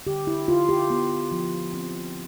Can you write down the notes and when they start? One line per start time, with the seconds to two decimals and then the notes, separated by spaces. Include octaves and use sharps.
0.07 D3 G4
0.27 E4
0.48 D3 F4
0.69 G4
0.90 B3
1.32 F3
1.73 C4